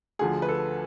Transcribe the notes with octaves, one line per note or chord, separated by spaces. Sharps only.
D2 D3 F3 G#4
B4
A4